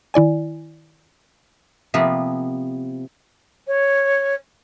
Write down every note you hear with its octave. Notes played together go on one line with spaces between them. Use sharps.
D#3 E4 D5 G#5
C3 F3 A#3 B3
C#5